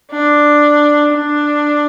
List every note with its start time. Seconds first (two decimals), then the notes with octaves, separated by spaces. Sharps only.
0.11 D4
1.14 D4